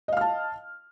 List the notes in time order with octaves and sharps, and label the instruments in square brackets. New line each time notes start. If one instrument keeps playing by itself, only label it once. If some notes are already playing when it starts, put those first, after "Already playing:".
[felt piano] D#5
F5
F6
A5